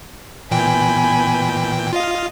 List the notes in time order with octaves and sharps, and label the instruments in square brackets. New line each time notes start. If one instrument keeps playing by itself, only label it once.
[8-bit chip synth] A#2 E3 G5 [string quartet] B3 G#5 B5
[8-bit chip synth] F4 F5 [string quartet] D#5